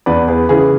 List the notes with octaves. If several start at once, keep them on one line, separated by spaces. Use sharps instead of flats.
E2 B4 D5
G#4 B4
C#3 E3 G#4 B4